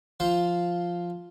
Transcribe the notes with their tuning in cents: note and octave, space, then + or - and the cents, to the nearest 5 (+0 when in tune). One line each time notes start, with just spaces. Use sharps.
F3 +0 F4 +0 C5 +0